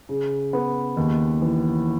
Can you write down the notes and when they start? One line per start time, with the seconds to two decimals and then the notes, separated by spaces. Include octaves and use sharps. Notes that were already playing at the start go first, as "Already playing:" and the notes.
0.09 C#3
0.53 B3
0.97 D#2
1.41 E3